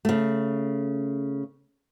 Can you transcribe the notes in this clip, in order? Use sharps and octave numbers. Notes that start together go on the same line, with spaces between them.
C#3 A3